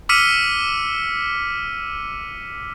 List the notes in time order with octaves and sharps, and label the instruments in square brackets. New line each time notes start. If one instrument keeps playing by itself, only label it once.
[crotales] D6 E6 F6 B6 C#7 D#7